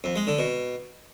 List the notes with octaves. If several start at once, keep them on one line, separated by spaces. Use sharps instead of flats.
F2
G#3
D3
B2